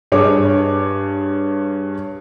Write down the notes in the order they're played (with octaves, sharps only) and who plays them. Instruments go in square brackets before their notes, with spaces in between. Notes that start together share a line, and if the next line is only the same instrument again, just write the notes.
[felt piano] G2 G#4 C#5 D6